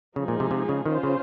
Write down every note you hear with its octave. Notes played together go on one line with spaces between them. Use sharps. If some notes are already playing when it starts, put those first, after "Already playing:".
C#3 F3 G#3 D#4 G#4
A#2
C3
C3
C#3
D#3 C#4 F4 C5
C#3